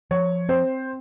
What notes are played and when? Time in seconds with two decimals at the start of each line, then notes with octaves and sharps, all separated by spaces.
0.11 F3 C#5
0.49 C4 C5